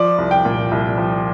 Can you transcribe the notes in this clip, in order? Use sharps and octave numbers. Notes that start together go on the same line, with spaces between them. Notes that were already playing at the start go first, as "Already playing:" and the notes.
Already playing: F3 D5
C2
G5
A#2
C2
F3